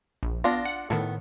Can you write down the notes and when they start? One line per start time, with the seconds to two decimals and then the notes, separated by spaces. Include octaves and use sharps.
0.23 A#1
0.44 B3 D4 F4 A#6
0.65 F#5
0.90 A2 D#3 B3 A4